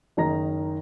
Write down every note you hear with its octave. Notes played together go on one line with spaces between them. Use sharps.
F#1 D#3 D#5 A#5 A#6